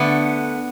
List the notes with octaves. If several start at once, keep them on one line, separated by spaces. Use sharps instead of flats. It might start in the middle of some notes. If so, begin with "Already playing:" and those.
Already playing: D3 A3 B3